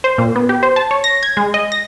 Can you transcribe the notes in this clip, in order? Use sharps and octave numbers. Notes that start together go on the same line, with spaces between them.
C5
A#2
B3
G4
C5
A5
C#5
A#6
G#6
G#3
D#5
A#6